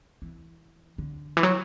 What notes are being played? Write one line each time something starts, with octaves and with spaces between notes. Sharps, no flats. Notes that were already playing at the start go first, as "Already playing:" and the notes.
E3
D3
E3
F#3